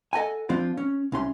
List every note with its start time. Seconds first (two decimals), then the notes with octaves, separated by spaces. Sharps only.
0.13 A4 D#5 F#5 G#5
0.49 F3 C4 D4 F4
0.77 C#4
1.12 C2 C#4 C6